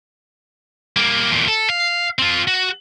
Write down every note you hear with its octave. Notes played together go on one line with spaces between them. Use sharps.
G3 A#3
E2 A#2
A4
F5
C4 F4
F#4